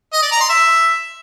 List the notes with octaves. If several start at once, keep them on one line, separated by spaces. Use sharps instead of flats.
D#5
D5
A#5
C6
E5